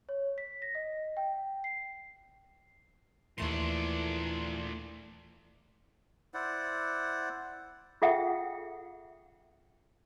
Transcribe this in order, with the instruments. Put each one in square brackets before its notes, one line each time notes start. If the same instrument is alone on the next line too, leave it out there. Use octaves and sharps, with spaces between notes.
[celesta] C#5
B6
A#6
D#5
G5
C7
[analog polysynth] D#2 A3 C6 [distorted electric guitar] A#2 D4 [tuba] E3
[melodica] E4 C5 D5 F#5
[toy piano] F4 G#4 A4 E5 F#5 G5